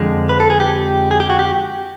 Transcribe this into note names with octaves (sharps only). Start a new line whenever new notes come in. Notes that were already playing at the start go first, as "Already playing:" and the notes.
Already playing: F2 D3 F3 G#3
B4
A4
G#4
G4
G#4
G4
F#4
G4